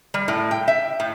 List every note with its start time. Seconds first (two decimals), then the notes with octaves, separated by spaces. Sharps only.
0.14 G3
0.28 A2
0.51 G5
0.68 E5
1.00 A2